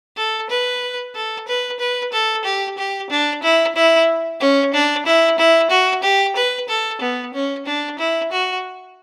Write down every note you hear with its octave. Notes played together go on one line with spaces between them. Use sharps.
A4
B4
A4
B4
B4
A4
G4
G4
D4
E4
E4
C#4
D4
E4
E4
F#4
G4
B4
A4
B3
C#4
D4
E4
F#4